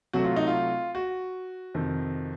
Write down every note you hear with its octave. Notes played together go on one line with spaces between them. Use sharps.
C3 F#3 A3 F#4
F4
D#4
F4
F#4
F2 C3 D#3